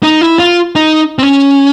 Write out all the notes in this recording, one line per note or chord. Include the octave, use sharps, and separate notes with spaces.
D#4
E4
F4
D#4
C4
C#4